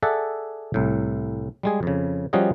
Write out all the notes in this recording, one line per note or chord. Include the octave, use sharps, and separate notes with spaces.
G#4 A4 D5 E5 F#5
C2 A2
G3 G#3 G#4
F2 C#3
F3 G3 C#4 F#4 G#4 D#5